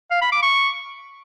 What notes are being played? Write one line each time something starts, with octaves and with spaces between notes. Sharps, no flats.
F5
B5
D6
C#6